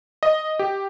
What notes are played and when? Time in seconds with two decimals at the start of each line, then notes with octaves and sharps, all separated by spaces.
0.23 D#5
0.59 G4